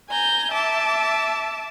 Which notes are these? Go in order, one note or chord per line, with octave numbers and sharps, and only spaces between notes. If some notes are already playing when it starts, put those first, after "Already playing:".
G#5 A#5 G6
E5 A5 D6